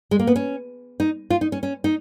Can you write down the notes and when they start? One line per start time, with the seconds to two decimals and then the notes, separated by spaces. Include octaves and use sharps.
0.11 G#3
0.19 A#3
0.27 B3
0.36 C#4
1.00 D#4
1.30 F4
1.41 D#4
1.52 C#4
1.63 C#4
1.84 D#4